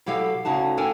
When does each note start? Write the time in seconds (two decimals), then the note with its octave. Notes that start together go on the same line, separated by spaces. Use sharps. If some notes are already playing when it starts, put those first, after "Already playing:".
0.06 B2 F#3 G4 A4 F5
0.45 D2 C#3 D#4 F#4 A5
0.77 D4 A4 A#4 G5 G#5